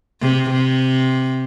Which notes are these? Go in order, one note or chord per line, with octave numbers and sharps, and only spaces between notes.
C3
C3